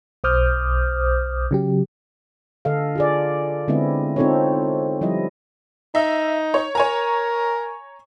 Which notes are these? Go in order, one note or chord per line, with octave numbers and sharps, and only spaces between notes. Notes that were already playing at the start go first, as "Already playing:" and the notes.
B1 C5 D6 D#6 F6 G6
C#3 F#3 G4
D3 A4 D#5 F5
F4 G#4 D5
D3 G#3 B3 C4 E4 D#5
C4 D#4 F4 A4 C5 C#5
F3 G3 E4 D#5
D#4 E5
C#5
A#4 C#5 G#5 A#5